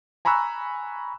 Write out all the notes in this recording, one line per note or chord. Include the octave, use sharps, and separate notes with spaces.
G#5 A#5 B5 C#6 E6 F#6